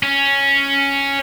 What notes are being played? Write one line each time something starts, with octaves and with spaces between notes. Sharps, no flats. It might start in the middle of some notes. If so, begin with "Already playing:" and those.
C#4